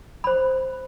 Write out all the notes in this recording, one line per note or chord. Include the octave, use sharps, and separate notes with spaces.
C5 B5